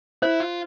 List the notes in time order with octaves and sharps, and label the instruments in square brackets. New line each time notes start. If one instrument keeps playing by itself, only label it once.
[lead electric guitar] E4 [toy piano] C5
[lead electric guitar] F4